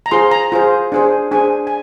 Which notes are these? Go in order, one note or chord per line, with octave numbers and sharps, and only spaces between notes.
A#5
F4 G#4 C5 C6
A#5
F4 G#4 C5
D4 G#4 C5
D4 G#4 C5 G#5
G#5